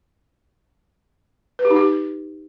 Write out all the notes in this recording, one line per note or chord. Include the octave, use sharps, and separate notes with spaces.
B4
G4
D#4
G4